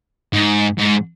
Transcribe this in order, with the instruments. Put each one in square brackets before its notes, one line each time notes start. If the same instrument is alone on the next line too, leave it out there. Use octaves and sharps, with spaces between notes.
[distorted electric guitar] G#2
G#2